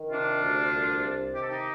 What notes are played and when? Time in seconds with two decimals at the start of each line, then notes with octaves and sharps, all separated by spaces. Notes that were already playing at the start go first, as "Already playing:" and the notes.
Already playing: D#3
0.11 C3 D4 F4
0.42 D2
0.73 C2
1.03 C3
1.34 D#3 G4
1.42 A4
1.49 D#4 G4